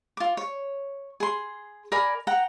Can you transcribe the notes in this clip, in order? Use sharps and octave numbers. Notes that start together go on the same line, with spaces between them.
F4 D6
C#5
G#4 C6
A#4 D5 G#5 B5
F#5 G5 A#5